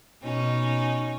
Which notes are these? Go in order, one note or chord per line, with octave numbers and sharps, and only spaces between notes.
B2 C#4 D#4